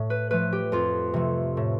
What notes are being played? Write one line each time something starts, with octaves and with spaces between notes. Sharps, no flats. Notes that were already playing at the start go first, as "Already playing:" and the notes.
Already playing: A2
B4
F3 A3 B4
G4
F2 F4
C3 F3 A3
A2